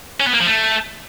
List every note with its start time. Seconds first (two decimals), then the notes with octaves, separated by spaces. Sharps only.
0.20 C#4
0.27 B3
0.33 A#3
0.40 F3
0.47 A3